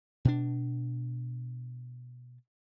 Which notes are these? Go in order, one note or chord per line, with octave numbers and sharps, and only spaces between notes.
B2 D4